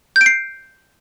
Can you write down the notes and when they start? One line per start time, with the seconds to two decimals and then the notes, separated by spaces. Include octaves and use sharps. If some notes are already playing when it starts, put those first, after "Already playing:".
0.16 G6
0.21 D7
0.26 C7